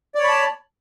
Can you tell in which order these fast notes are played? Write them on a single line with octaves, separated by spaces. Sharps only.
D5 C#5 B5 A5